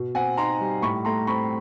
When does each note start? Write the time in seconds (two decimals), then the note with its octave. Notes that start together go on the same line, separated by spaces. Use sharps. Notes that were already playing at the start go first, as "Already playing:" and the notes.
Already playing: B2
0.15 C4 F#5 G#5
0.37 D#4 A#5 C6
0.61 G3
0.82 A2 B5 C#6
1.05 A3 A#5 C6
1.27 C4 B5 C#6